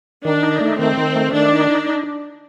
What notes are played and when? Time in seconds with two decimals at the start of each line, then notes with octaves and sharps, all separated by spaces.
0.25 D#3 D4
0.43 D#4
0.61 A3
0.79 D#3 C4
0.97 D#3
1.15 A3
1.33 D#3 D4
1.52 D#4
1.69 D#4